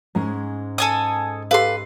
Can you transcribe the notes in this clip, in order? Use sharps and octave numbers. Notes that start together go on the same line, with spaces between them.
G#2 G#3 C#4
A4 G#5 D#6
G4 A4 B4 F5 C6